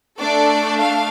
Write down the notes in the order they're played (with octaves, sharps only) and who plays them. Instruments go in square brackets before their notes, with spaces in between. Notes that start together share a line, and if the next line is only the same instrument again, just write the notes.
[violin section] A3 D4 A4 D5
F5